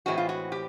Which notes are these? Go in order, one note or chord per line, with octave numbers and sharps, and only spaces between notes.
A2 E3 G#3 C4 F#4
F4
F#4
G4